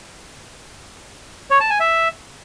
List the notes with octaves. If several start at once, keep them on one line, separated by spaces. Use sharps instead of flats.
C#5
A5
G#5
E5